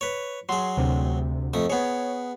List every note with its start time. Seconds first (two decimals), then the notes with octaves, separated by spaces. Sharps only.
0.01 B4 C#5
0.49 F#3 G#4 C6
0.77 D2 C3
1.54 F2 A3 D#6
1.70 B3 G#4 C#5